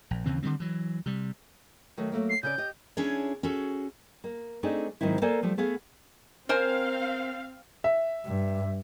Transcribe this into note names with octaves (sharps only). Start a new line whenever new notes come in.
A#1
D#2 C#3 E3 C4
D3 D#3 G3 C4
E3 F#3
C3 G3
D#3 F#3 A3
F#3 A3 A#3
C7
C#3 C#4 D5 G6
G4 D#5
C#4 D4 E4 G#4 A4 C#5
C#4 F#4 G#4 A4
A#3
A3 C4 D4 D#4 G#4
G#2 D#3 F#3 C4 E4
A#3 A4 C5 D5 G#5
F3 G3 A3
A3 B3 G#4 F5
C4 A#4 C5 F5 G#5
E5
G2